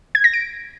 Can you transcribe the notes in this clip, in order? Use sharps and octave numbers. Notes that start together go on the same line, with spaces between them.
G#6
A#6
D7